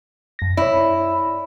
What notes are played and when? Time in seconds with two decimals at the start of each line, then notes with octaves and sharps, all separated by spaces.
0.39 F#2 A#6
0.57 E4 C#5 D5